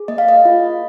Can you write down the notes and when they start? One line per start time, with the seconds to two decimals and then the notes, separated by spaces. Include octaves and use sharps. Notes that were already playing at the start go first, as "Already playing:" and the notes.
Already playing: G#4
0.08 A#3 D#5
0.18 F5
0.28 D#5
0.45 F4